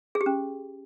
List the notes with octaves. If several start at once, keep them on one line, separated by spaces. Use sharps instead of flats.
G#4
G4
C#4